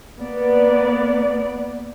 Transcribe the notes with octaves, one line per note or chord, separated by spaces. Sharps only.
A#3 B3 D5